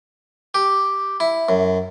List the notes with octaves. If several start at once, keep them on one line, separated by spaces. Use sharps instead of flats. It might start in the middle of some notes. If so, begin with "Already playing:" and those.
G4
E4
F#2